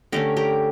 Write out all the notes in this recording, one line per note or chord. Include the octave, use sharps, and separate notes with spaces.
D3 A3 C#4 G4 A#4
G4 A#4